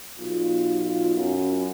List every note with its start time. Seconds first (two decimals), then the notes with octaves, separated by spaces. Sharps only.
0.18 B1 F4
1.15 F#2